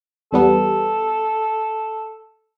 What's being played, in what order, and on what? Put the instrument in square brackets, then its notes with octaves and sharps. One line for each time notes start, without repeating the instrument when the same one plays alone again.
[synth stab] E2 G3 B3 [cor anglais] A4